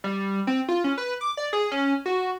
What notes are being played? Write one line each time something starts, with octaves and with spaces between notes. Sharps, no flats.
G3
C4
F4
C#4
B4
D6
D5
G#4
C#4
F#4